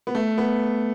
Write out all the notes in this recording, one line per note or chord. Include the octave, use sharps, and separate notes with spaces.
B3
A3
B3